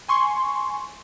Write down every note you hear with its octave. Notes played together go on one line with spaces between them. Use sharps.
G#5 C6 C#6